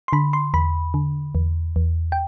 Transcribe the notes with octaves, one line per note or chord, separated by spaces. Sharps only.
C6
D3 B5
C6
E2 B5
D3
E2
E2
G5